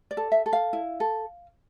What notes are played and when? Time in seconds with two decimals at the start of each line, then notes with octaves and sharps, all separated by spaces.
0.11 D5
0.17 A4
0.32 E5
0.46 A4
0.53 F5
0.73 E4
1.00 A4